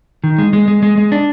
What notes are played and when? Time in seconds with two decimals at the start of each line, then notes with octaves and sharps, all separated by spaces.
0.24 D#3
0.38 G#3
0.53 G#3
0.68 G#3
0.83 G#3
0.98 G#3
1.12 D4